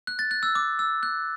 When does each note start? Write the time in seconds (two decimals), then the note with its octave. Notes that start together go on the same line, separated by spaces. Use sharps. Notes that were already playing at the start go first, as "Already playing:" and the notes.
0.07 F#6
0.19 A6
0.31 F#6
0.43 E6
0.55 D6
0.79 E6
1.03 F#6